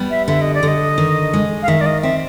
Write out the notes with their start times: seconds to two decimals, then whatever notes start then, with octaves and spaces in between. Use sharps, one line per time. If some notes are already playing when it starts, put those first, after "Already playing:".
Already playing: G3 B3
0.10 E5
0.28 D3 E5
0.41 D#5
0.54 D5
0.63 D3 D#5
0.98 D#3
1.33 G#3
1.63 F5
1.68 D#3 E5
1.81 D5
1.86 D#5
2.02 C4 E5